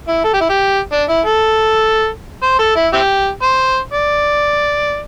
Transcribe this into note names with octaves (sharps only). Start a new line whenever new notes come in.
E4
A4
G4
E4
G4
D4
E4
A4
C5
A4
E4
C4 E4 G4
C5
D5